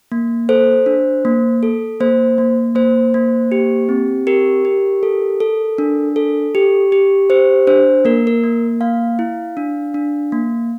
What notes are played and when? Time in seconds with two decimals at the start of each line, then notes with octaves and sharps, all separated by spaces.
0.12 A#3
0.49 A4 C5
0.86 D4
1.25 A#3
1.63 A4
2.00 A#3 C5
2.38 A#3
2.75 A#3 C5
3.14 A#3
3.52 G4
3.89 C4
4.27 G4 A#4
4.65 G4
5.03 A4
5.40 A4
5.78 D4
6.16 A4
6.55 G4
6.92 G4
7.30 G4 C5
7.67 D4 C5
8.05 A#3 A#4
8.27 A#4
8.44 A#3
8.81 A#3 F5
9.19 E4
9.57 D4
9.94 D4
10.32 A#3